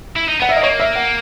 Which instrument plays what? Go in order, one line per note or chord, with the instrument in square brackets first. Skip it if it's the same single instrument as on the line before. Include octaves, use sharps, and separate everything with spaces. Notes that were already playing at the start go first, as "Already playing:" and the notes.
[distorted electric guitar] E4
D#4
[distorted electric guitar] B3 [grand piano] F#5
[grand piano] E5
[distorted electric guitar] A#3
[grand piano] D#5
[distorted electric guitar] A#3 [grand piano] C#5
[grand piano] E5
F#5